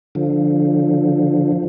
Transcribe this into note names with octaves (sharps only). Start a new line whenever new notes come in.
D3 F3